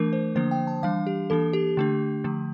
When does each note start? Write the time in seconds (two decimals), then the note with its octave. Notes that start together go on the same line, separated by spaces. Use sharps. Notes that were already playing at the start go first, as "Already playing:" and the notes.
Already playing: E3 A3 D4 A#4
0.13 C5
0.35 D3 F3 A#3 D4 C5
0.51 G5
0.67 A5
0.83 E3 G3 D4 F5
1.07 G4
1.30 E3 A#3 D4 A4
1.53 G4
1.77 D3 A3 D4
2.24 D3 F3 A3